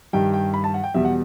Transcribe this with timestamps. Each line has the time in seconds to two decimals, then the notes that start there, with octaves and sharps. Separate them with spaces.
0.13 G2 D#3 G3 G5
0.34 G5
0.54 B5
0.64 A5
0.74 F#5
0.84 G5
0.94 E2 B2 G3 E5
1.05 F#5